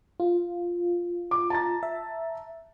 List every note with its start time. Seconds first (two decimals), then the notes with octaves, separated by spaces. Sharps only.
0.20 F4
1.31 D6
1.50 A5 A#5 A6
1.83 E5